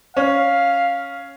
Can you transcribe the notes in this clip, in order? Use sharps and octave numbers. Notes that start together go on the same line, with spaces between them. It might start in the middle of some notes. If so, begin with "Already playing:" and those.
C#4 F5